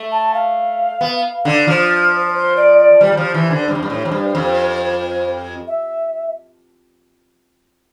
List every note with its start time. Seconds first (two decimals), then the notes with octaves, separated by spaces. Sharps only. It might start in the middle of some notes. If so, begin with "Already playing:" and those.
Already playing: A3
0.12 A5
0.34 F5
1.01 B3
1.45 D3
1.67 F3 C5
2.34 C5
2.57 D5
2.78 D5
3.01 G3 C5
3.12 G3
3.17 F3
3.34 E3
3.51 D3
3.68 G2 C5
3.75 F2
3.83 G2
3.90 A2
4.05 F2
4.11 G2
4.35 F2
5.67 E5